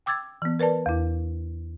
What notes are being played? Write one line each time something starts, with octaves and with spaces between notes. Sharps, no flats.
G5 D6 E6 G#6 A6
E3 B3
A#4 B4 D5 A5
E2 E4